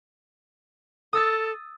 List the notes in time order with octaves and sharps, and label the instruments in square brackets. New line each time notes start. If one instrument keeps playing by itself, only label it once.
[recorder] A4 [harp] D#6 E6 A6